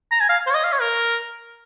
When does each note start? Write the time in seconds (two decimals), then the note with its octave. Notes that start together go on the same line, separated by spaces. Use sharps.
0.12 A#5
0.21 G#5
0.29 F5
0.47 C5
0.50 C#5
0.55 D#5
0.64 F5
0.72 C#5
0.81 A#4